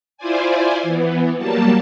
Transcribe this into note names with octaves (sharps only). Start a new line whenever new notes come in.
E4 F4 C5 D5 G#5
E3 B3
F#3 G3 A#3 A5